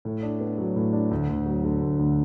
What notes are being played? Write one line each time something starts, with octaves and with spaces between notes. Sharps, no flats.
A2
D4
B3
F#3
A2
D4
D2
D2
F#3
D3
D2
D2